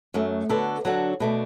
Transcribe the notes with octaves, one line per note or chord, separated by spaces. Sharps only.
F#2 F#3 A3
D3 B3 F#4 A4
D3 F#3 D4 F#4 A4
B2 A3 D4